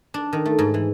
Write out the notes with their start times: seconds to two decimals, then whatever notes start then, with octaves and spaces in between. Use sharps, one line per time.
0.14 D4
0.33 D#3
0.45 A3
0.59 G#2
0.74 E3